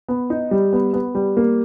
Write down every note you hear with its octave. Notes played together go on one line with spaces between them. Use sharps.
B3
D#4
G3
B3
B3
G3
A#3